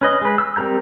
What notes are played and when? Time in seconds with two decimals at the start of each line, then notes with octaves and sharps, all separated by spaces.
0.01 C#4 B4 D#5
0.21 G#3 B4
0.38 E6
0.56 G3 C4 A#4 A#5 G6